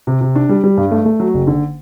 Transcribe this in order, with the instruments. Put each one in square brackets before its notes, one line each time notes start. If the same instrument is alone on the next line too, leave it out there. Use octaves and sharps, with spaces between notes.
[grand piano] C3
C3
D4
G3
G3
G2
A3
A3
F#3
F#1
D3